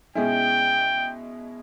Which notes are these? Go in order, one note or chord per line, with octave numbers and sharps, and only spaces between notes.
B2 G#3 C#4 E4 G5